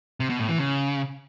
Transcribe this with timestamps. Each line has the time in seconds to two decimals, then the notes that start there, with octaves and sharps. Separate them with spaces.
0.20 C3
0.30 B2
0.39 A2
0.49 E3
0.58 C#3